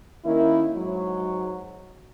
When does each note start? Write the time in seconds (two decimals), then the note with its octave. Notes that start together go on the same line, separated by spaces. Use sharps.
0.25 D#3 A#3 C#4 E4
0.75 G#2 F#3